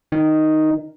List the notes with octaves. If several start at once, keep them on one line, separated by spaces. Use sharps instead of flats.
D#3